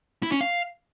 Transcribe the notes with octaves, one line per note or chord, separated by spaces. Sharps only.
E4
C#4
F5